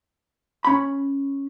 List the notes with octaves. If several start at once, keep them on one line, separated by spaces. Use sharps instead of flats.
C#4 B5